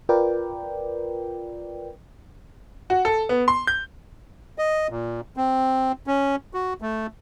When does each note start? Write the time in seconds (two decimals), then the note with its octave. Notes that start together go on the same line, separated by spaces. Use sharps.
0.09 F4 A#4 B4 D5 G5
2.90 F#4
3.05 A4
3.29 B3
3.48 C6
3.67 G6
4.58 D#5
4.90 A#2
5.37 C4
6.07 C#4
6.54 F#4
6.82 A3